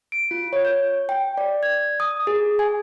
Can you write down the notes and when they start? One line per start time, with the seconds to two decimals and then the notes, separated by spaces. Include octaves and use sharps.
0.12 D7
0.31 F4
0.53 C#5
0.65 G6
1.09 G5
1.38 D5
1.63 G#6
2.00 D#6
2.27 G#4
2.59 G#5